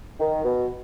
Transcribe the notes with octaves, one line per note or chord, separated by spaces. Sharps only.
D#3
B2